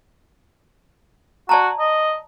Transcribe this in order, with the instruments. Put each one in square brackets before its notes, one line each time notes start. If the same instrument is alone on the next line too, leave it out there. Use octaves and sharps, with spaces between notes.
[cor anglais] F#4 [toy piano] D5 A5 A#5
[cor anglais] D#5